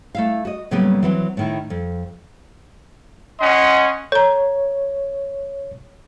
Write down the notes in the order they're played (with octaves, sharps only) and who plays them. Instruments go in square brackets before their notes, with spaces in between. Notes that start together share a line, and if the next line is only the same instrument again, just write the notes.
[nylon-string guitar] A3 E4 F5
F#4 D#5
A2 C#3 F#3 G3 A#3 B3
E3 F#3 C4
A2 D#3 E4
F2
[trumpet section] C#4 D#5 F#5 C6
[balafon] A4 A#5 [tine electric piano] C#5